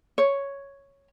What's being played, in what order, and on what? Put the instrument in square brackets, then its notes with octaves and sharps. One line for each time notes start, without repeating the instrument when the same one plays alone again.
[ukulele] C#5